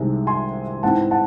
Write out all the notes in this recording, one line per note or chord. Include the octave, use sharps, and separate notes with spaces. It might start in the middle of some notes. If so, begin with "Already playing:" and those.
Already playing: C2 C3 D#3 G#3
G#5 C6
G#2 E3 C4 F#5 A5
F#5 A5